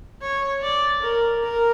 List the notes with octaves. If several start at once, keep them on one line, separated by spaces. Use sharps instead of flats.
C#5
D5
A#4
A#4